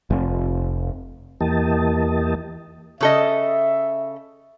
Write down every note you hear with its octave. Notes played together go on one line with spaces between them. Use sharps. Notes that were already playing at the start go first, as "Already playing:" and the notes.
F1
E2 E3 A#3 G4 D#5 A5
C#3 A4 D#5 E5